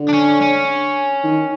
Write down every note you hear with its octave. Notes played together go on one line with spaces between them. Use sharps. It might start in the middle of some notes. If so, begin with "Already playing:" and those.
Already playing: D3
D4
C#4
C#4
D#3